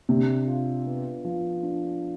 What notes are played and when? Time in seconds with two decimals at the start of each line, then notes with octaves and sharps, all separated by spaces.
0.09 C3 D4
0.47 F4
0.86 B3
1.25 F3
1.63 D4